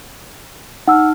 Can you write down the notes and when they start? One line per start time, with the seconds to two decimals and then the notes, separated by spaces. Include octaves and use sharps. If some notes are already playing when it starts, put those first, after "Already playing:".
0.88 D#4 F#5 A5 E6 F6